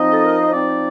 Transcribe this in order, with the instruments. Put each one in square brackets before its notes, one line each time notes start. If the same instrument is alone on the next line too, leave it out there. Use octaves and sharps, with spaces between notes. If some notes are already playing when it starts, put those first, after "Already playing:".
Already playing: [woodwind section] F3 C4 D#4 D#5
A4
A#4
C5
F3 C4 D#4 D5